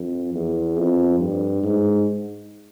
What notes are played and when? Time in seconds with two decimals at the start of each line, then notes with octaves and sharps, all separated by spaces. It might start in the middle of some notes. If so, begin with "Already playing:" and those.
Already playing: F2
0.34 E2
0.77 F2
1.20 G2
1.63 G#2